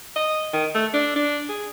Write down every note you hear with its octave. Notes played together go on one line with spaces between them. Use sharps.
D#5
D#3
A3
D4
D4
G#4